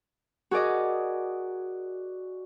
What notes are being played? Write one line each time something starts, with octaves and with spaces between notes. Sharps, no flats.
F#4 G#4 A#4 D5 D#5